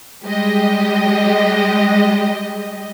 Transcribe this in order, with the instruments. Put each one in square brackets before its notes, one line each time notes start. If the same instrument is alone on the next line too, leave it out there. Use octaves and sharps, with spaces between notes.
[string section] G3 G#3 G4 D#5